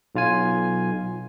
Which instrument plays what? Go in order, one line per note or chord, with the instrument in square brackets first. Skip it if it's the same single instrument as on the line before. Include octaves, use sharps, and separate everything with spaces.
[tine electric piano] B1 F4 G#5